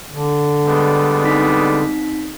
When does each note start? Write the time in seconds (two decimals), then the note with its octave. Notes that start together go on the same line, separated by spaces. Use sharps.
0.12 D3
0.66 G3 G#3 B3
1.23 C4 D#4 B6